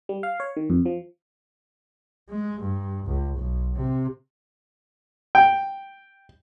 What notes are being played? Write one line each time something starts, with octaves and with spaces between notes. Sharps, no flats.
G3
F5
C#5
D#3
F2
F3
G#3
G2
C#2
B1
C3
G5